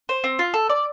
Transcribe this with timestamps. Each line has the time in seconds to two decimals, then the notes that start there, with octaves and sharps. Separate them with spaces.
0.09 C5
0.24 C4
0.39 F4
0.54 A4
0.69 D5